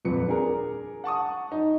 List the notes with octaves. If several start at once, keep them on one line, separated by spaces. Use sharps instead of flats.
D#1 F2 B4 C#7
D4 G#4 A#4
F#5 A5 C#6 D#6
D#4